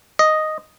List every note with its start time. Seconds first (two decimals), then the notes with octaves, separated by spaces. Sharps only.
0.19 D#5